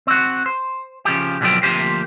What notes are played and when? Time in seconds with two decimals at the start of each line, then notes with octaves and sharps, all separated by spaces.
0.07 C4 F#4
0.46 C5
1.05 C#3 F3 G4
1.41 C#2 B2 D3 F3 F#3 G5
1.63 D2 F3 A#3 G4 C5